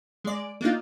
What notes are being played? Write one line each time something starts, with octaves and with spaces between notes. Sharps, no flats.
G#3 D5
A#3 D4 D#4 F4